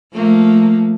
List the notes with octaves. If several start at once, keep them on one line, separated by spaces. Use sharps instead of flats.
F3 A3 A#3